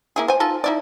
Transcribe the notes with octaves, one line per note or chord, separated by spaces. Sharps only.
A#3 E4 G#4
C5 G#5
D#4 F4 A4
D#4 E4 D5